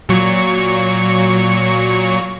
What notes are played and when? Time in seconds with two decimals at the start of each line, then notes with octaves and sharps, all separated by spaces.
0.09 A#2 F#3 C#6